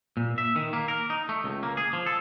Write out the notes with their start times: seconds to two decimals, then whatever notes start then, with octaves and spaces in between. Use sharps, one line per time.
0.17 A#2
0.38 E5
0.56 D#3
0.73 A#3
0.88 A#4
1.10 D#4
1.29 A3
1.44 C#2
1.63 A#3
1.77 G#4
1.93 F3
2.06 A4